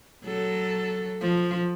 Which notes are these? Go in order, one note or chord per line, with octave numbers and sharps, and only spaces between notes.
F#3 A4
F3